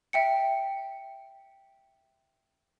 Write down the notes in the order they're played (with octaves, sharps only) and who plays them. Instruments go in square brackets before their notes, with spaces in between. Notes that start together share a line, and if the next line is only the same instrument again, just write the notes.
[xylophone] E5 G5 C#7